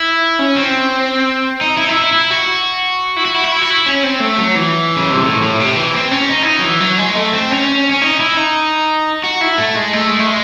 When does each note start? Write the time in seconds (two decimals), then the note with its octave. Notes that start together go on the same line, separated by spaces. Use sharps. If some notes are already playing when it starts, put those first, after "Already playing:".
Already playing: E4
0.39 C#4
0.57 C4
1.61 D#4
1.77 E4
1.85 D#4
1.89 E4
2.02 E4
2.13 E4
2.30 F#4
3.16 E4
3.25 F#4
3.35 E4
3.44 F#4
3.52 E4
3.62 F#4
3.70 E4
3.86 C#4
4.03 C4
4.20 A3
4.38 F#3
4.55 E3
4.96 C#3
5.11 C3
5.25 A2
5.42 A2
5.60 C3
5.76 E3
5.94 C4
6.11 C#4
6.29 D#4
6.43 E4
6.46 D#4
6.59 F#3
6.64 E3
6.80 F#3
6.98 G#3
7.15 A3
7.33 C4
7.51 C#4
7.91 C#4
8.02 D#4
8.19 E4
8.37 D#4
9.24 F#4
9.41 E4
9.58 A3
9.75 G#3
9.93 A3
10.10 G#3
10.19 A3
10.27 G#3